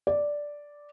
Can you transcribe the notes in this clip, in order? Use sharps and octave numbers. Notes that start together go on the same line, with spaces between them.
D5